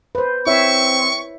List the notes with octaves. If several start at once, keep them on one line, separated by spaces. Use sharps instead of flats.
B4 C5
C4 E4 C#5 E5 C#6